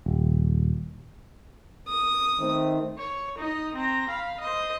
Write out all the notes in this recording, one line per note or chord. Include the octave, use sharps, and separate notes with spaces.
D#1
D#6
D#3 A3 C4
C#5
D#4 D#5
C4 A#5
F5 B5
C5 D#5